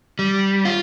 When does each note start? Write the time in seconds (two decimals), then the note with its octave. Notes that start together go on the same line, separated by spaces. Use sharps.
0.19 G3
0.65 F4